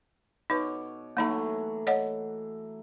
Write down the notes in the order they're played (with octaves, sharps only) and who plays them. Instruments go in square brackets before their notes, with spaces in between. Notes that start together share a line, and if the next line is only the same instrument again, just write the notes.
[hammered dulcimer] B2 C#5 D6 [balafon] D#4 B4
[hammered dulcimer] E3 F#3 A3 [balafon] A#3 D#4 A#5
[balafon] C#5 D#5 F#5